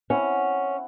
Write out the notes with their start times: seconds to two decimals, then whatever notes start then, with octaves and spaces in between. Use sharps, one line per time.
0.10 C4 C#4 E4 F#5